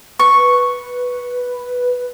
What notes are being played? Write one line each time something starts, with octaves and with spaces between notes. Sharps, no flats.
B4 C#6